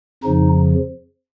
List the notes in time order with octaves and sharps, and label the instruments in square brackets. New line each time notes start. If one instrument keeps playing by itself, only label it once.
[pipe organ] F2 C#3 F3 D#4